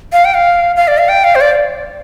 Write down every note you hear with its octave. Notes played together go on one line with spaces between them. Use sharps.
F5
G5
F5
F5
D5
F5
G5
F5
C5
D5